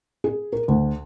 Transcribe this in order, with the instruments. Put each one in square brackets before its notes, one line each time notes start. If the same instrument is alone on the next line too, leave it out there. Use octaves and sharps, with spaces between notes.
[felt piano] G#4
A#4
D2